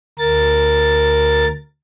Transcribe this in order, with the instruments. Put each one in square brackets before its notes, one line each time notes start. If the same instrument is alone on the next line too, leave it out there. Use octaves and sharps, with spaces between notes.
[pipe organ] D2 A#4 A6